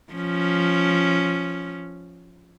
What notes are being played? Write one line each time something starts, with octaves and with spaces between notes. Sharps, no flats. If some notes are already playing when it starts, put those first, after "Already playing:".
F3 C#4